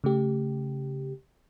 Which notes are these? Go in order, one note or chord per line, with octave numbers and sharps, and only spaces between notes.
C#3 A3 G4